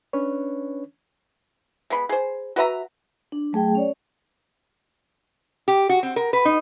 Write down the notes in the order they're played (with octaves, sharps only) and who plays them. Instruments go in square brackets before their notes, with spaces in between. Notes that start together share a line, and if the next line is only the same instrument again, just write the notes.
[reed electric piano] C#4 D4 B4 C#5
[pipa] G#3 B3 B5
G#4 C5
F#4 B4 E5 A#5
[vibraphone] D4
F#3 A3 G#4 G5
C#4 C#5 D5
[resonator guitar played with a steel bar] G4
F#4
C4
A#4
B4
D#4